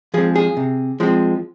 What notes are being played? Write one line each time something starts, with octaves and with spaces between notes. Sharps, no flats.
F3 G#3 C4 G#4
G#4
C3
F3 G#3 C4